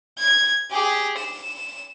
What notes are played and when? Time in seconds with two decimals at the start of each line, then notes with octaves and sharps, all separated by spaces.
0.18 G#6
0.71 G4 G#4
1.18 E7